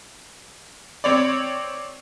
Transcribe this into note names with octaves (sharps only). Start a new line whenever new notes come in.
C4 C#5 D5